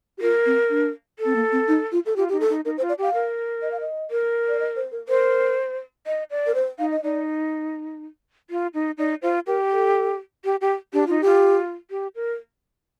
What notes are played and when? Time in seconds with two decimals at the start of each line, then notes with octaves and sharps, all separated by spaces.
0.18 G4
0.21 F4 A#4
0.46 C4
0.70 D4
1.19 A4
1.25 C4
1.35 A#3
1.52 C4
1.68 D#4
1.92 F4
2.06 A4
2.16 F4 G4
2.29 D#4 G4
2.40 A4
2.49 D#4
2.65 D#4 A#4
2.77 C5
2.81 F4
2.89 D5
2.98 G4 F5
3.14 A#4
3.62 D#5
3.71 F5
3.80 D#5
4.11 A#4
4.48 D5
4.60 D#5
4.76 C5
4.92 A#4
5.08 A#4 C5
6.07 D#5
6.31 D5
6.47 A#4
6.55 C5
6.79 D#4 F5
6.91 D#5
7.03 D#4 D5
8.50 F4
8.74 D#4
8.98 D#4 D5
9.22 F4 C5
9.47 G4 A#4
9.72 A4
10.45 G4
10.61 G4
10.93 D4 G4
11.07 D#4 F4
11.21 F4 G4
11.91 G4
12.15 A#4